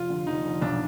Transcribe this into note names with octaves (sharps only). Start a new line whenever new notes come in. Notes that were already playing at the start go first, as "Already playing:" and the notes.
Already playing: F1 F4
D3
F1 D#4
F1
B1 D4